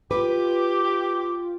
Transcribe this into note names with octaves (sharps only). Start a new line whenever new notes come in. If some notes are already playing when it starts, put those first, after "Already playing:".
F4 G4 B4 D6